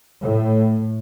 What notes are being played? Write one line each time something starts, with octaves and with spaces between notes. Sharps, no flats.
A2